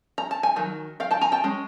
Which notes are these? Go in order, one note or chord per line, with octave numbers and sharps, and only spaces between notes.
A#5
A5
G#5
D#3 F#3
F5 G5
G5 A5
G#5 A#5
G5 A5
G#3 C#4